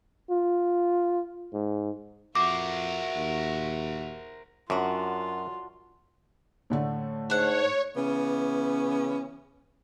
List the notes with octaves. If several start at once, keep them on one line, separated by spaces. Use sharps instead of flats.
F4
G#2
F2 F#4 A#4 C5 E5 D6
D#2
F#2 D4 F4 F#4
A2 D3 A3
G#2 D4 C#5 F#5
C#3 E3 B3 C#4